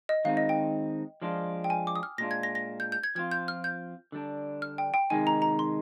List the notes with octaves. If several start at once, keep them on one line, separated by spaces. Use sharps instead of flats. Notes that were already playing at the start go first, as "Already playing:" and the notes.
D#5
D#3 G#3 C4 D#4 F5
D#5
G5
F3 G#3 D4 F4
G5
G#5
D6
D#6
F6
A#2 G#3 D4 F4 A#6
G#6
A#6
A#6
G6
G6
G#6
F3 C4 F4 G#6
G6
F6
G6
D3 G3 D4
F6
G5
G5
C3 D#3 G#3 D#4 G#5
A#5
A#5
C6